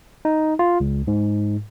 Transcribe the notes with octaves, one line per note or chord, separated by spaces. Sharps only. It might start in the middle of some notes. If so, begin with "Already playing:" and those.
D#4
F4
C#2
G#2